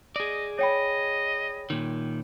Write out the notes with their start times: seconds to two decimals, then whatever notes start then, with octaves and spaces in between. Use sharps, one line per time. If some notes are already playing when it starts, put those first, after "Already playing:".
0.16 G#4 D5 D#5
0.59 C#5 D#5 G5 B5
1.70 A#2 D#3